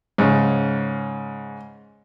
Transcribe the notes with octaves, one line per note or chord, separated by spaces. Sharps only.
G#2 C#3 C#4